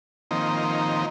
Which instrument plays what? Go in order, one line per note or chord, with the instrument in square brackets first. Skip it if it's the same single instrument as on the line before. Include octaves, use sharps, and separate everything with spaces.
[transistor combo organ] D#3 F3 A#3 C4 D#4